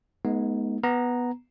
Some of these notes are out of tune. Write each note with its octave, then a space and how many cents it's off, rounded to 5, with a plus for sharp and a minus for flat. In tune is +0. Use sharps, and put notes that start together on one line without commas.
G#3 +35 B3 -15 D#4 +0
B3 -5 A#5 +0